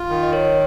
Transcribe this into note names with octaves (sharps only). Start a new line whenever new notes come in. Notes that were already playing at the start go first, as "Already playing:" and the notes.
Already playing: F4
D#3
D#5
A#4 C#5
C#5